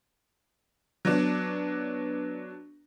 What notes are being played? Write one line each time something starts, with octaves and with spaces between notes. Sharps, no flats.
F#3 B3 D4